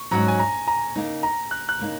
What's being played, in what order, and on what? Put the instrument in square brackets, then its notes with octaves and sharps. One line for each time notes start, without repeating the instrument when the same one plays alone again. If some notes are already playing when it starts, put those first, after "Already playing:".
Already playing: [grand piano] C#6
[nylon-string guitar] G#2 F#3 C#4 F#4 [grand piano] A#5
[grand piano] G#5
A#5
A#5
[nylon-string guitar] C#3 A#3 D#4
[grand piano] A#5
F#6
F#6
[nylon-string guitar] C#3 A#3 D#4